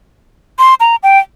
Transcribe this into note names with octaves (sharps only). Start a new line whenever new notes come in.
C6
A#5
G5